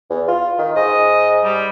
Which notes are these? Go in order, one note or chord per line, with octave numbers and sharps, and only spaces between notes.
E2
F4
D#3
G#2 D#5
G3